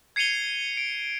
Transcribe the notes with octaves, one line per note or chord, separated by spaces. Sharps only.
G#6 C7 C#7 D#7 F7 G7
D7